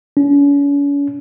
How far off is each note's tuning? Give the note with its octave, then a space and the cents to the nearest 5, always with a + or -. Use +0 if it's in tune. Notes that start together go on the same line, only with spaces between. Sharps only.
C#4 +40